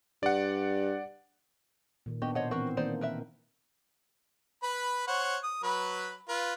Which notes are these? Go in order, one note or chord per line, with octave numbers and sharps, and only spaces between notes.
G2 D5 F#5
A#2 D#3
B3 D4 F#4 G4 D#5
B2 C5 C#5 D#5 F#5
E3 C4 F#4 A#4 B4
D#3 A#3 D#4 C5 D5
A#4 B4 E5
B4 B5
C5 C#5 F#5
D#6
F#3 B4 B5
F4 B4